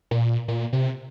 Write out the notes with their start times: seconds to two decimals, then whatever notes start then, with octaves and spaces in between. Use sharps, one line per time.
0.11 A#2
0.48 A#2
0.73 C3